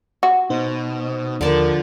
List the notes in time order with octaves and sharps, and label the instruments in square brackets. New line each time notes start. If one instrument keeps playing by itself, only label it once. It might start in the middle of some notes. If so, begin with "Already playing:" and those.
[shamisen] F#4
[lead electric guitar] B2 [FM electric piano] D#4 C5
[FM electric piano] D#2 A#4 [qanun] D3 D5 A5 [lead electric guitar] F3